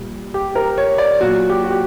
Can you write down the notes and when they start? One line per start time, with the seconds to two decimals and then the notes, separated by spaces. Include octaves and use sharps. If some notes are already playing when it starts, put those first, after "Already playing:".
Already playing: A#2 G3
0.34 G4
0.55 A#4
0.78 C#5
0.98 D5
1.20 A#2 F#3 F#4
1.50 G4
1.64 F#4
1.70 G4